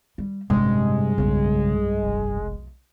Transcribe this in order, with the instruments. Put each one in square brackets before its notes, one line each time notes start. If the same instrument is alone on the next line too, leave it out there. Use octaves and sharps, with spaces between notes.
[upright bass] G3
[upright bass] A1 G3 [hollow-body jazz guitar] G2 [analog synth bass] C3 [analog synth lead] G#3
[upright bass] B1 F2 [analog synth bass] C#3
[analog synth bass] F1